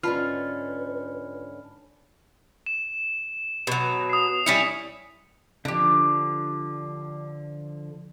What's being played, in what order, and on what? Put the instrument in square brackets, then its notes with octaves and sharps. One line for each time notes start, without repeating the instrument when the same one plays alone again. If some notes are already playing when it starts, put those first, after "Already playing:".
[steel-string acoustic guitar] G#2 D3 C#4 [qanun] F4 [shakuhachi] B4 [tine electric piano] A5 B5 F6
[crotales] E7
[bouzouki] B2 F#3
[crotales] D#6 C7
[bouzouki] G3 C#4 E4 [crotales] B6 C#7
[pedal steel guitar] D3 F3 [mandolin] D4 G4